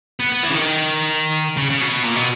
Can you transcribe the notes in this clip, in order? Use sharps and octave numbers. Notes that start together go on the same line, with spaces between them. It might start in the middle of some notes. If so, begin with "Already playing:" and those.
B3
B3
E3
C#3
D#3
C#3
C#3
B2
A#2
B2